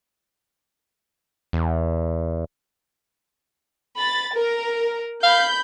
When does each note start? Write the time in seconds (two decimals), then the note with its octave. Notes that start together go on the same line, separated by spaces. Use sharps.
1.53 E2
3.97 B5 A6
4.33 A#4
5.23 F5 B5 G6